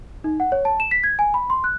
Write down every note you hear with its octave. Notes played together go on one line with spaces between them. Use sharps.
D#4
F#5
C#5
A5
E7
B6
G#6
G#5
B5
C6
F#6